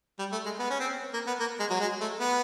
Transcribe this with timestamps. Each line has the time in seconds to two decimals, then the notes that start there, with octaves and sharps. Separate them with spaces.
0.19 G3
0.32 A3
0.45 G#3
0.59 B3
0.70 C#4
0.79 C4
1.13 A#3
1.27 B3
1.40 A#3
1.59 G#3
1.70 F#3
1.80 G#3
2.00 A3
2.20 B3